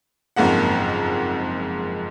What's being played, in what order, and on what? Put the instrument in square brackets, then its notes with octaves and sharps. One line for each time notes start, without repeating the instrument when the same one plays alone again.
[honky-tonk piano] F#1 F2 G#2 A#3 F#5